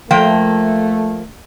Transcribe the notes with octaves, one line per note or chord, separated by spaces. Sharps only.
F3 A3 A#3 G5